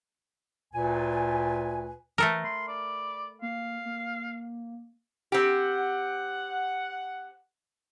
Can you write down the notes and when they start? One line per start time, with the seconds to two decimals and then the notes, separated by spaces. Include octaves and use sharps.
0.74 D2 A#2 B4 G#5
2.18 E3 A3 A4 A#4
2.44 B5 C6
2.68 D5
3.42 A#3 F5
3.85 A#3
5.32 C4 G4 F#5